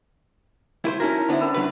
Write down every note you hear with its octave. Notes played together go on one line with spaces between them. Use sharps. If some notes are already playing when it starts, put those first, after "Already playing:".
E4 B4 C5
C#4 D#4 E4 F#4 A#4
D3 B3 D4 C5 E5
C#4 A#4 B5
D2 F#3 B4